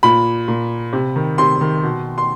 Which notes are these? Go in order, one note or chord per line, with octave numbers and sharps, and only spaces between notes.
A#2 B5
A#2
C3
D#3
C3 C6
D#3
B2
C6